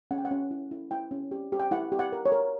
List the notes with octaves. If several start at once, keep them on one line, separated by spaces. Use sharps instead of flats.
C#4 F#5
G5
F#5
C#4
E4
E4
E4 G5
C#4
G4
G4
G5
E4 F#5
G4
F#5
A#4
C#5
A#4